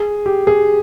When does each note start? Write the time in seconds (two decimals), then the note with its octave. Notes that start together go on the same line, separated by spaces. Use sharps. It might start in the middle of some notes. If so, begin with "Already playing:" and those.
Already playing: G#4
0.26 G4
0.47 G#4